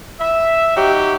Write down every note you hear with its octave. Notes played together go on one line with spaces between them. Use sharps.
E5
F#3 D#4 F#4 G4